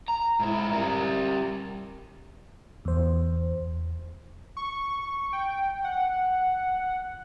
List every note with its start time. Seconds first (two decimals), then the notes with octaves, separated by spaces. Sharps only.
0.08 A#5
0.40 G#2 E4
0.73 G3 A#4
2.85 E2 C5
4.57 C#6
5.33 G5
5.84 F#5